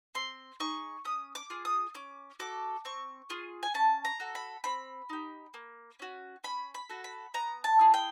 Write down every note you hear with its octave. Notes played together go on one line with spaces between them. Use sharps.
C4 C6
D#4 G#4 C#6
C#4 D#6
D6
F4 G#4
D#6
C#4 D6
F#4 A4 D6
C4 C#6
F4 G#4
G#5
C#4 A5
A#5
F#4 A4
B5
C4 B5
D#4 G4
A#3
C#4 F#4
C#4 B5
B5
F#4 A4
B5
B3 A#5
A5
E4 G#4
G5